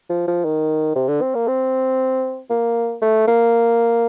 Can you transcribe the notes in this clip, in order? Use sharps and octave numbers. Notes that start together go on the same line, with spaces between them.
F3
F3
D#3
C3
D3
C4
A#3
C4
A#3
A3
A#3